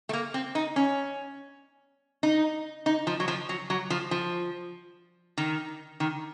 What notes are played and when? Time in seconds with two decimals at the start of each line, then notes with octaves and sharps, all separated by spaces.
0.09 A3
0.13 A#3
0.34 C4
0.55 D#4
0.76 C#4
2.23 D#4
2.86 D#4
3.07 F3
3.20 F#3
3.28 F3
3.49 F#3
3.70 F#3
3.90 F3
4.11 F3
5.37 D#3
6.00 D#3